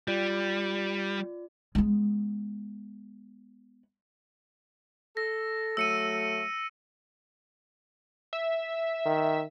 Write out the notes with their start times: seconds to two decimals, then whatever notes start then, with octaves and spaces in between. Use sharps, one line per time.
0.08 G3 F4 D5
1.75 G#3 B3
5.17 A4 A#6
5.77 F#3 A3 E6 C#7 D#7
8.33 E5
9.06 D#3